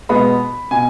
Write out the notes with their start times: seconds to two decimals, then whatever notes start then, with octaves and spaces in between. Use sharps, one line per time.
0.09 B2 G#3 B3 B5
0.71 B2 G#5